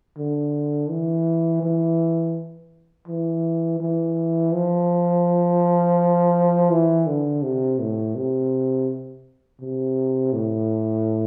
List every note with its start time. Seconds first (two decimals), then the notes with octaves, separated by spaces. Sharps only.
0.17 D3
0.90 E3
1.62 E3
3.07 E3
3.80 E3
4.52 F3
6.70 E3
7.07 D3
7.42 C3
7.79 A2
8.15 C3
9.60 C3
10.33 A2